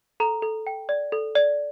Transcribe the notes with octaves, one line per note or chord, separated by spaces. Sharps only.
A4 A#5
A4
G5
D5
A4
D5